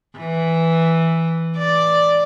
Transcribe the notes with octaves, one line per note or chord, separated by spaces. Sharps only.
E3
D5